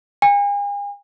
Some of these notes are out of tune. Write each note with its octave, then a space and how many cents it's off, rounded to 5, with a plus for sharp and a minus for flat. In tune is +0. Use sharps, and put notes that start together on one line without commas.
G#5 -40